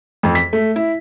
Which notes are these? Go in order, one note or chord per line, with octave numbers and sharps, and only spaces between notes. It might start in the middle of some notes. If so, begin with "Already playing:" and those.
F2
B6
A3
E4